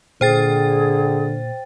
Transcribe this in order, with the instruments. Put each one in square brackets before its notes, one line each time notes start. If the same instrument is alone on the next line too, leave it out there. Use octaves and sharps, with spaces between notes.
[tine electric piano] A#2 [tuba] D3 [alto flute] G#4 [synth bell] C5 G5 A6